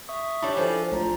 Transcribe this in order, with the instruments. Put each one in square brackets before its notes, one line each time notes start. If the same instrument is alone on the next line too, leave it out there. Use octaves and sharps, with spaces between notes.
[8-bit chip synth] E5 C#6 D#6
[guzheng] G3 D4 [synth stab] E4 C#5
[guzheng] F3 [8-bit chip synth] A4 C5 G#5
[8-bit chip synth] B1 F4 A#5 [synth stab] A2